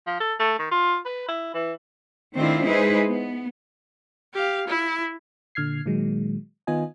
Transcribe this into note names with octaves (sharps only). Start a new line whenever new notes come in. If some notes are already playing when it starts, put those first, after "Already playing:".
F3
A4
A3
D#3
F4
B4
E4
E3
D#3 A3 C4 D4 E4 F4
G#3 D#4 E4 G#4 B4 C5
B3
G4 F5
E4
A#2 D3 F6 G#6 C7
A#2 D#3 F#3 G#3
D#3 B3 F4 D#5 G#5